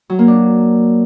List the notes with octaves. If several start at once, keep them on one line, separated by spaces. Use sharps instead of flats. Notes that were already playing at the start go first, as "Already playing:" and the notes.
F#3
A#3
D4